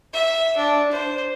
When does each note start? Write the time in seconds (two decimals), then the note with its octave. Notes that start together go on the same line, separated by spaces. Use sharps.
0.13 E5
0.57 D4
0.91 C5